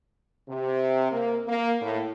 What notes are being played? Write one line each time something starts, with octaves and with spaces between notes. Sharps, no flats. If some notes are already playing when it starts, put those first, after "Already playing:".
C3
A#3
A#3
A2